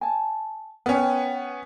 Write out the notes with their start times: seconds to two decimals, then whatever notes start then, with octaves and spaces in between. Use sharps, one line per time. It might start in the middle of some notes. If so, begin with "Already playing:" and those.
0.01 G#5 A5
0.86 B3 C#4 A#4 B4 G5